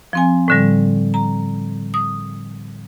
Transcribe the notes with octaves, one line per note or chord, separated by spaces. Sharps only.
F3 C4 G#5
A2 D3 G3
A#5
D#6